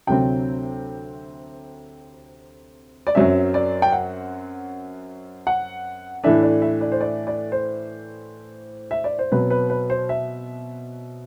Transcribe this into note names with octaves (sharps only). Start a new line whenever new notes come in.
D2 C3 F#3 C4 G5
D5
F#2 F#3 C4 E5
D5
G5
F#5
F#5
A2 E3 A3 D4 E5
D5
E5
D5
C5
D5
D5
C5
E5
D5
C5
B2 F#3 C4 B4
B4
B4
C5
E5